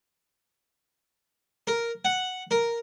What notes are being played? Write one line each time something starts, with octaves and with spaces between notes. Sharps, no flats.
A#4
F#5
A#4